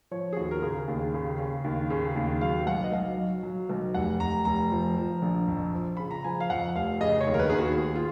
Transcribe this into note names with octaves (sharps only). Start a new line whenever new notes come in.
F3 C#5
G#4
D#2 F#4
A#4
C#3 G#4
D#2
C#3
C#3
D#2
C#3
D#2
F#3 F5
B1 F#5
D#5
B1 F5
F#3
F#3
B1
F1 F#5
F1 A#5
F1 A#5
F3
F3
A#1
F2
F3
C#3 B5
A#5
F3 G#5
F5
F2 F#5
F1 F5
C#3 D#5
C#5
D#2
A#4
B4
D#2 G#4
F#4
D#2 G#4
F4